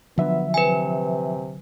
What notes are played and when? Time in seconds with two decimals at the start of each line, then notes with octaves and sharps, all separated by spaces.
0.18 D3 F3 F#3 B3 D4 E5
0.54 C3 B4 G#5